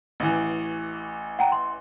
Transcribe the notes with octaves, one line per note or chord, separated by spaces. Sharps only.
A1 E3
F#5 G5 A#5
C6